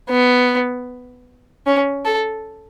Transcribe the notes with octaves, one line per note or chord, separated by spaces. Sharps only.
B3
C#4
A4